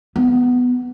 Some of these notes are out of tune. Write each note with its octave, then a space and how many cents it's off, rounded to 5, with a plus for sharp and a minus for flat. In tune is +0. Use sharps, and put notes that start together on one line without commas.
B3 +5